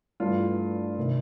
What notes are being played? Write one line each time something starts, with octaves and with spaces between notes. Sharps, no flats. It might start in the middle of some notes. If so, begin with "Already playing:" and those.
G2 E3 A3 F4
C3 D#3